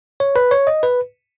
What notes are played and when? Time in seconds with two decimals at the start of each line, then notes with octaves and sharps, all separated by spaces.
0.20 C#5
0.36 B4
0.51 C#5
0.67 D#5
0.83 B4